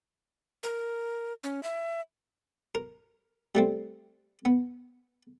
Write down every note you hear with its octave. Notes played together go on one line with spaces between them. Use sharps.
A#4
C#4
E5
A#4
G3 A3 C4
B3